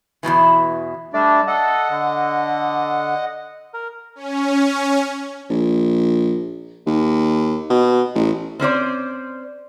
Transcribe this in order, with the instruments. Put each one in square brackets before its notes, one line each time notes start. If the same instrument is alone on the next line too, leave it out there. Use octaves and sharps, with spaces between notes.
[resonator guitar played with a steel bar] E2 G2 B2 E3
[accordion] G3 D4 [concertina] A3 D5
[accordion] A4 [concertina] D#5 F#5
[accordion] D3
[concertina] A#4
[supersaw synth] C#4
[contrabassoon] A#1
D#2
B2
A1
[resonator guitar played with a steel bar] C4 C#4 C5 D5